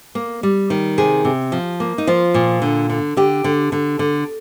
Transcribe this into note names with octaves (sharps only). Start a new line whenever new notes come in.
A#3
G3
D#3
C3 G#4
C3
F3
A#3
D#4
F3 F4
A#2
D3
D3
D3 G4
D3
D3
D3